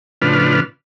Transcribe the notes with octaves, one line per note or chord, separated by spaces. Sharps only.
A2 C#3 F3 D4 B4 F6